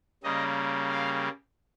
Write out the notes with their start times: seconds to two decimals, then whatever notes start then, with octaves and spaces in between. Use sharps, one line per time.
0.23 C#3 G3 A#3 D#5
0.89 F5